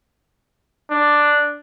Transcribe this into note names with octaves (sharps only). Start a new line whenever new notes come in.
D4